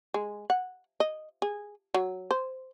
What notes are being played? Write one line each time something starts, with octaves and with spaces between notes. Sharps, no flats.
G#3
F#5
D#5
G#4
F#3
C5